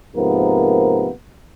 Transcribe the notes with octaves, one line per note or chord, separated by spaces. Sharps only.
G#2 C3 F3 A#3 B3 A#4